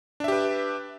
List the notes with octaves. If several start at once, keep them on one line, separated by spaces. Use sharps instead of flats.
D4 G4 B4 E5